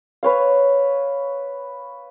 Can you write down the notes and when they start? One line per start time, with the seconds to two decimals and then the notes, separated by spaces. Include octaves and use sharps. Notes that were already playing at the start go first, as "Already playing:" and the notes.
0.23 B4 C#5 F5